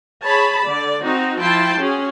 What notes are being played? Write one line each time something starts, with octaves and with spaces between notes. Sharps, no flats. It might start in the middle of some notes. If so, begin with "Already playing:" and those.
G#4 C#5 A5 B5
D3 D5
C4 D#4 F#4
F3 E4 F4 G5 A5 C6
C#4 F#4 G#4